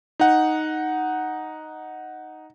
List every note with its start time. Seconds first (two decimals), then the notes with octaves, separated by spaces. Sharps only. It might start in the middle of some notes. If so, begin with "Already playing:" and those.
0.20 D#4 F#5